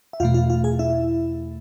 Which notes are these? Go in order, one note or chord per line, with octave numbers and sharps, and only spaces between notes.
E5
E2 B2 A3 F4 F5
F4 F5
F4 F5
G#4 G#5
E4 E5